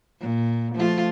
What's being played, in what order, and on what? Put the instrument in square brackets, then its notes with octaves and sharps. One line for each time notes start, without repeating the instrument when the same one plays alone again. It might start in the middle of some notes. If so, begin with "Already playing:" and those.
[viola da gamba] A#2
F3 A3 F4